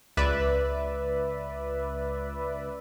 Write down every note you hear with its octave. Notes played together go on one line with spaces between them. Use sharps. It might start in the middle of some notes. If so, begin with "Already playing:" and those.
C#2 B4 D5 E5